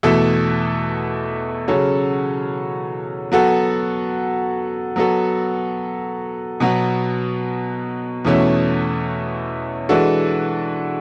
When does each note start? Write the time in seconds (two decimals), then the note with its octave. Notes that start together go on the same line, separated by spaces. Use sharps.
0.03 E2 B2 A3 E4 A4
1.68 C#3 F#3 C#4 F#4 A4
3.32 F#3 B3 F#4 A4
4.96 F#3 B3 F#4 A4
6.60 B2 F#3 B3
8.25 E2 B2 A3 C#4 E4
9.89 E3 G#3 D4 F#4 A4